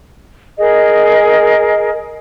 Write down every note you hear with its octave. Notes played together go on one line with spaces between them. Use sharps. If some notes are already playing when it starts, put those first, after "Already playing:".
G#4 A#4 D#5